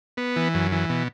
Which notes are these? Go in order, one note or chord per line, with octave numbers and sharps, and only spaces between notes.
B3
E3
F#2
E3
B2